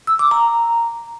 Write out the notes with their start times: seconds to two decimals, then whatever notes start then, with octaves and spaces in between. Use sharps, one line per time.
0.07 E6
0.19 D6
0.31 A#5